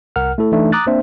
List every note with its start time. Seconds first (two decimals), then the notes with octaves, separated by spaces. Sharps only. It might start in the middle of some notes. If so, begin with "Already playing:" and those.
0.16 C2 A#4 F#5 F6
0.38 A3 E4 A4
0.52 E3 A3 D4 D#4
0.72 A#5 D6 D#6 F#6 A6
0.87 A#3 C4 D4 C5 E5